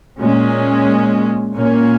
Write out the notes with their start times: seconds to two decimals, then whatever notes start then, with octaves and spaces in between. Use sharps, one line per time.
0.19 A#2 G#3 C#4
1.54 A#2 A#3 C#4